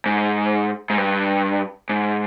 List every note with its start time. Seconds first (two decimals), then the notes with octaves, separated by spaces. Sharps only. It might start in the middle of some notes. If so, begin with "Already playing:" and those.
0.06 G#2
0.90 G#2
0.97 G2
1.90 G#2